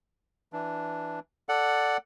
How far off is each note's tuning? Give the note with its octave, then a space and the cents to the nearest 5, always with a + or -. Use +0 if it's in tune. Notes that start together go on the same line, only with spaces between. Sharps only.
E3 +0 D4 +0
A4 +5 D5 +0 F#5 +0